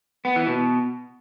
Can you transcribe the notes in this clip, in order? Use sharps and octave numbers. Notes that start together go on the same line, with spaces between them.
B3
E3
B2